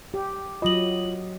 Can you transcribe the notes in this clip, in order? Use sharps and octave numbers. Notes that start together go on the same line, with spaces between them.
G4
F#3 F4 D#5 F#7